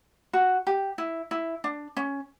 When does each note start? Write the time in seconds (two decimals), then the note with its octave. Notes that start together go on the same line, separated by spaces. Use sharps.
0.33 F#4
0.67 G4
0.98 E4
1.31 E4
1.64 D4
1.97 C#4